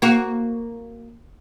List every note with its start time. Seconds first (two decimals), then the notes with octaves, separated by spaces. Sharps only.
0.02 A#3 F#4